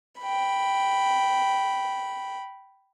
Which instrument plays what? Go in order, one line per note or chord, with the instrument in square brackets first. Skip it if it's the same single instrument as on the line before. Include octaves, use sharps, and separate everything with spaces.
[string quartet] G5 B5